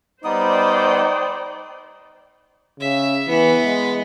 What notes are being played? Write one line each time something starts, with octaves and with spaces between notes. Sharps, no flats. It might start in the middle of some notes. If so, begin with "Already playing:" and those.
G3 B3 D#4 C5 D5 G5 D#6
C#3 E5
E3 B3
G#3